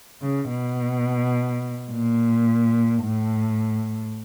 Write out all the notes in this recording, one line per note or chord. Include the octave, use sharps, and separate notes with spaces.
C#3
B2
A#2
A2